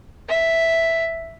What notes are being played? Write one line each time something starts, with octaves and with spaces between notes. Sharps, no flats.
E5